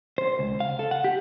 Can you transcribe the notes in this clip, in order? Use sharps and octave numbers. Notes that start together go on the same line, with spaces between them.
C5
C#2
F5
A4
F#5
G4